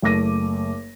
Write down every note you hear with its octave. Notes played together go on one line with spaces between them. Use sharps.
F#1 A3 D6 A#6 D#7